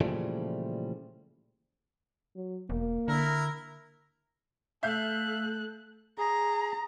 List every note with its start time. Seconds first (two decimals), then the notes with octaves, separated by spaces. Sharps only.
0.01 A#2 C#3 E3 F3 G3 A3
2.36 F#3
2.70 E1 A#3
3.08 D3 E4 A#4
4.83 A3 A4 E5 F5 F#6 G6
6.18 G#4 A#5